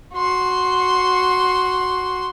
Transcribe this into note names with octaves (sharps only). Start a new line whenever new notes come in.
F#4 C6